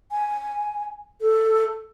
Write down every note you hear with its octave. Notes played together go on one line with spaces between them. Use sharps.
G#5
A4